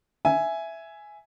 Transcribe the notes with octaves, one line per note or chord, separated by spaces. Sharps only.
E5 G#5